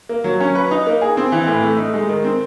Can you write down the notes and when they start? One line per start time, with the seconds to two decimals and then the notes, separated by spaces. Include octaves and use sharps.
0.09 A#3
0.24 F#3
0.40 C#4
0.55 B4
0.71 D#4
0.87 A#3
1.02 G#4
1.17 C4
1.32 E3
1.48 A2
1.63 A3
1.78 D#4
1.94 G#3
2.09 D#3
2.24 C4